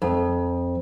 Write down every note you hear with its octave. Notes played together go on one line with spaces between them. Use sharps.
F2